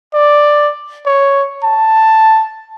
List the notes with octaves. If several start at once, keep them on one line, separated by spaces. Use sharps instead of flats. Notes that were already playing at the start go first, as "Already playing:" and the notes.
D5
C#5
A5